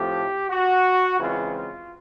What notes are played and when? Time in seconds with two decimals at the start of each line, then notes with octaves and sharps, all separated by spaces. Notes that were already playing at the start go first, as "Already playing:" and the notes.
Already playing: A2 F3 A3 C4 G4
0.49 F#4
1.20 C#3 E3 G#3 C4 F4
1.55 F4